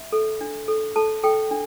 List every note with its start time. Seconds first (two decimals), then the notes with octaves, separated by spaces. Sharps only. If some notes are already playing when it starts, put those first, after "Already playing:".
Already playing: E5
0.12 A4
0.41 D4
0.68 A4
0.96 A4 A5
1.24 A4 G5
1.51 D4